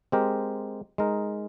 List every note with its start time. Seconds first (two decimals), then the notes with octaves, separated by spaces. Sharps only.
0.12 G#3 C4 G4 A#4
0.98 G#3 D#4 A#4